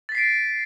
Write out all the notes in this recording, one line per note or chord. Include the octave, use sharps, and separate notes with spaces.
A6 B6 C7 D7